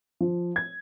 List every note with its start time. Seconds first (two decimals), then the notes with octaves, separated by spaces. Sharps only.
0.21 F3
0.56 G#6